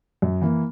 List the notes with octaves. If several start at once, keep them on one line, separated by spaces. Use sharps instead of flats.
F#2
E3 A#3